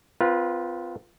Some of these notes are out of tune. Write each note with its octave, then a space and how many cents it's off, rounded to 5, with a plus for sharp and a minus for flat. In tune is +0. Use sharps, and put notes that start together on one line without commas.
C4 -35 F4 +0 B4 -25